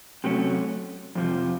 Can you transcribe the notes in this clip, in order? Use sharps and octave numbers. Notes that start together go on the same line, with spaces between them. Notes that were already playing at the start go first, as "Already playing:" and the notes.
C3 F#3 A3 C#4
F2 C3 F3